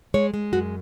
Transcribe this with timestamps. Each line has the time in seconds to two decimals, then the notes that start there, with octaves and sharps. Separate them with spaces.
0.14 G#3 C#5
0.34 G#3
0.53 F#2 F#4